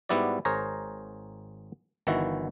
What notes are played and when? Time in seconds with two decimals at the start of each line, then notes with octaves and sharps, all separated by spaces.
0.09 G#2 G3 B3 E4 F#4 D5
0.45 G#1 G#4 A#4 C5 C#5 A#5
2.07 G1 D#3 E3 E4 F#4